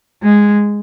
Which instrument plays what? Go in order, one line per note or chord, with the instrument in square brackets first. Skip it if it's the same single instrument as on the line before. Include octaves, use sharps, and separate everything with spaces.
[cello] G#3